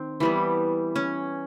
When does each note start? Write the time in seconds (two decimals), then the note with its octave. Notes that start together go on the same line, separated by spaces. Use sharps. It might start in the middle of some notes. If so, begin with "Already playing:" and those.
Already playing: D#3 C4
0.20 E3 G3 B3
0.96 C#4